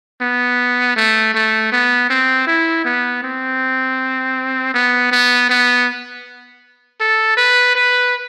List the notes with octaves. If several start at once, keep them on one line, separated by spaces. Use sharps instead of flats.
B3
A3
A3
B3
C4
E4
B3
C4
B3
B3
B3
A4
B4
B4